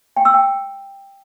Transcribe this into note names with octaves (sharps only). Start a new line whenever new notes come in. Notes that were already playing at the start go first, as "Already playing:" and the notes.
G5
E6
G5